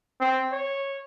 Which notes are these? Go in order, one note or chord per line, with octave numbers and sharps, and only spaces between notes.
C4
C#5